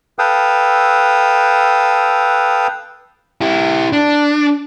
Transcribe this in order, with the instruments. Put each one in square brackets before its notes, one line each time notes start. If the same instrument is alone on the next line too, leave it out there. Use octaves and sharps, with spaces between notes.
[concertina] A4 B4 F5 G5 D#6 E6
[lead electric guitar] E4 G4
D4